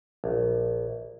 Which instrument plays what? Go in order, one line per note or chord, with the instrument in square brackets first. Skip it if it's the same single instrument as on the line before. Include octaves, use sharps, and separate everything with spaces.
[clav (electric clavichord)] A#1